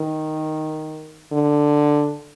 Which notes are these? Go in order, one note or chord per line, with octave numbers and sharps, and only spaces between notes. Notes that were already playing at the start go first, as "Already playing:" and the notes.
Already playing: D#3
D3